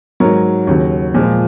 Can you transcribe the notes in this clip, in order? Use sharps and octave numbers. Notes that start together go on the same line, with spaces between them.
G#2 F#3 A#4 C#5
D#2 C#3 F#3
A#2 F3 G#3